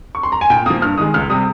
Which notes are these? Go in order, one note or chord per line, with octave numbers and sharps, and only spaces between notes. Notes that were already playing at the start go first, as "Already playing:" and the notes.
C#6
C6
A#5
G#5
A#2 G5
F3 A#3 D#6
G2 F6
D#3 G#3 D#6
C#2 F6
C3 G3 D#6